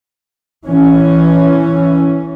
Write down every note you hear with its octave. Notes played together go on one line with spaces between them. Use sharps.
E3 C#4